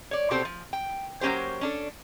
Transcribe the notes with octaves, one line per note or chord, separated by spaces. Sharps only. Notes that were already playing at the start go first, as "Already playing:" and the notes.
C#5 D5
B2 C4 G4 A4 C5
F3
G5
F#3 A#3 C#4 G4 C5
C#4 D4 A4